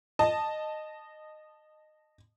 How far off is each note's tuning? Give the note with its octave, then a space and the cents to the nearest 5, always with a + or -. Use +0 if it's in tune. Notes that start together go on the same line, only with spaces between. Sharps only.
D#5 -15 A5 +0